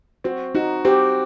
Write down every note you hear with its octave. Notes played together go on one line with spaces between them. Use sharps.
C4 F#4
D#4 F#4
C4 G4